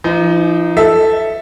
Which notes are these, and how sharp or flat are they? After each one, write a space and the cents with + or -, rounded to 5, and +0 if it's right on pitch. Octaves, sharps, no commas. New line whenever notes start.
F3 -40 D#4 +5
A4 +0 E5 +0